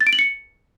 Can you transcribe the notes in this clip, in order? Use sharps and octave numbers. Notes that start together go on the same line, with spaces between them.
A6
D7
F#7
C#7